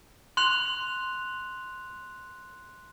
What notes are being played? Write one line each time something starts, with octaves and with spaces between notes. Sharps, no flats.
C6 F#6 F7